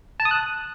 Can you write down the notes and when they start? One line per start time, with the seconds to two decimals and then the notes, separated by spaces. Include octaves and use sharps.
0.20 A5
0.25 D#6
0.31 F#6